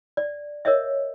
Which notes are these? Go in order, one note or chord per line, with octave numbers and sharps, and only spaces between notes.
D5
A#4 C#5 D#5 E5